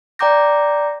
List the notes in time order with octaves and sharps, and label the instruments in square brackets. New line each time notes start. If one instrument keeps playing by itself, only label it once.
[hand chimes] D5 G5 A#5 D6 G6 A#6